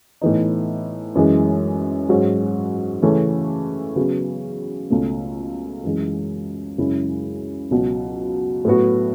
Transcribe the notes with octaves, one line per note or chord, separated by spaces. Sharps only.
A2 E3 B3 D#4
F#2 E3 G#3
G#2 F#3 C#4 F#4
C#3 E3 A3 C#4
C#3 F#3 B3
C#2 B2 A3
F#2 E3 G#3
F#2 C#3 G#3 C#4 E4
C#2 B2 F#3
A2 F#3 B3 F#4